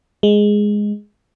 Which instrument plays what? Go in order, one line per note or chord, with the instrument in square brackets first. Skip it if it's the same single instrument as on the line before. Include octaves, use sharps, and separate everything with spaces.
[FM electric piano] G#3